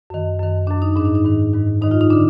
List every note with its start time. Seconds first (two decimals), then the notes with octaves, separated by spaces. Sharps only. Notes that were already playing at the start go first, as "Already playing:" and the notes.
0.10 F#2 D#3
0.40 F#2 D#3
0.67 F#2 D#3 D4
0.82 D#4
0.96 G#2 D#3 D4
1.05 D#4
1.15 D#4
1.24 G#2 D#3
1.53 G#2 D#3
1.81 G#2 D#3 D#4
1.91 F4
2.01 D#4
2.11 D3 D4